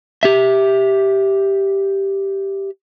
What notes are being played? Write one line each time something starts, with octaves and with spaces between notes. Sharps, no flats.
G4 E5